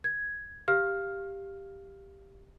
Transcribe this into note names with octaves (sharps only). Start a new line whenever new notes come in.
G#6
G4 F5 F6